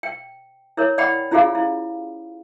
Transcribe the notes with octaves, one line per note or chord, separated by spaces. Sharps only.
G5
E4 A#4 C#5
D5 F#5 G5 B5
C#4 E4 F4 G4 G#4 F5
E4